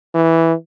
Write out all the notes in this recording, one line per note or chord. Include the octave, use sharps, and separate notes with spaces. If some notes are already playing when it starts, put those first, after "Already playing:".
E3